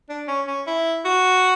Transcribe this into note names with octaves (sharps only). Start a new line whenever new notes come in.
D4
C#4
C#4
E4
F#4